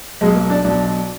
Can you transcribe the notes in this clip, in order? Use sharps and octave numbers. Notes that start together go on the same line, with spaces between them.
B1 B2 F#3 G#3
A#3
D4
B1 B2 F#3 D4